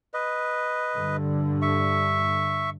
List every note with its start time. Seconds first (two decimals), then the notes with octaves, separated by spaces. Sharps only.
0.14 B4 D#5
0.95 G2 D3
1.62 E5 C#6